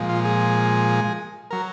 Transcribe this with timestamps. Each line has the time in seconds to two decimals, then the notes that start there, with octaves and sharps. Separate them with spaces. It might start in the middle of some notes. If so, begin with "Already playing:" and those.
Already playing: A#2 F3 G#3
0.09 F4
0.25 G#4
1.51 F#3 A#4